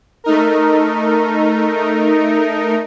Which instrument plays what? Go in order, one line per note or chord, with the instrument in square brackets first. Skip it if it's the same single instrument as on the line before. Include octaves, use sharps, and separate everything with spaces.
[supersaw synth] A3 D#4 A#4